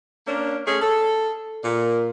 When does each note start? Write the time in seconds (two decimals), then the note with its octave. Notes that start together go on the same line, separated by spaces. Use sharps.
0.27 A#3 C#4 D4
0.66 A3 C#4 G#4
0.81 A4
1.63 A#2